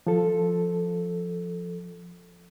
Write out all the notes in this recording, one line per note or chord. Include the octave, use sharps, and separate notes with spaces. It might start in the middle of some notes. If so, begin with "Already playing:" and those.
F3 A4